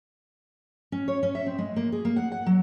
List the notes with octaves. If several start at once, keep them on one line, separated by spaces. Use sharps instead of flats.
C#4
C#5
C#4
E5
C4
G#3
A#3
G#4
A#3
F#5
F#5
F#3